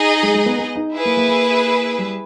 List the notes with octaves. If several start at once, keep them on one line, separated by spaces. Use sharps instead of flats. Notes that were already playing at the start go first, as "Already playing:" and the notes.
Already playing: D#4 G#4 D#5
G#3
G#3
B3
B3
D#4
E4 G#4 B4
A#3
A#3
A#3
G3